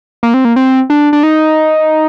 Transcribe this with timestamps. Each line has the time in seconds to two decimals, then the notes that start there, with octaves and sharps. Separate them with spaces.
0.23 A#3
0.34 C4
0.45 A#3
0.56 C4
0.90 D4
1.13 D4
1.23 D#4